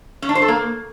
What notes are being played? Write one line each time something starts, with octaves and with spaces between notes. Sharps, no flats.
C#4
D4
C5
A4
A#3